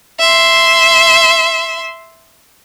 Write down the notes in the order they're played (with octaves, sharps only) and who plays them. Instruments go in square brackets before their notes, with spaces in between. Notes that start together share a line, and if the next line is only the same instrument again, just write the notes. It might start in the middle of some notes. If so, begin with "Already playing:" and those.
[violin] E5 C6